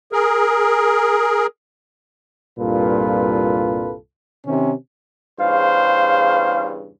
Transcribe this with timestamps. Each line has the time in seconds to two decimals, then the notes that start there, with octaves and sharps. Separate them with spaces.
0.12 G#4 A#4
2.59 C2 G2 A#2 F4 A4 B4
4.46 C3 D#3 C#4
5.40 E2 G2 C#3 C5 F5